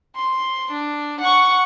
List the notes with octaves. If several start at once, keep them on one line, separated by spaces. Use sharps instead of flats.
C6
D4
F#5 C#6